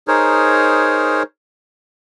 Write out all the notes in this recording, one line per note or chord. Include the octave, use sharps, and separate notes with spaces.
D#4 G#4 A#4 C5 C#5